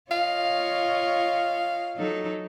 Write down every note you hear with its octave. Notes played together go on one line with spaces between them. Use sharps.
F4 C#5 D#5 F5
F#3 D#4 A4